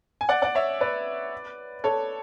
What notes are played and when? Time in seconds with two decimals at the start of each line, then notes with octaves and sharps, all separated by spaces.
0.21 G#5
0.29 D5 F#5
0.42 D5 F#5
0.55 C#5 E5
0.81 B4 D5
1.84 A4 C#5